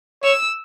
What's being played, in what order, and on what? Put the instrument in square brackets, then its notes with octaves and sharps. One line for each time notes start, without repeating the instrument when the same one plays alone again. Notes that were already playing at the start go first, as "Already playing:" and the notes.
[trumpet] C#5 [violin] E6